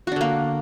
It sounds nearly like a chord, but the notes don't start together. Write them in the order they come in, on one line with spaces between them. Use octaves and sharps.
F#4 D4 D3 A#3